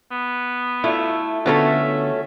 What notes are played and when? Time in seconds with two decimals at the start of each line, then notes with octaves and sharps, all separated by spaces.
0.11 B3
0.84 A3 E4 F4
1.46 D3 A3 B3 C#4 F4 F#4 E5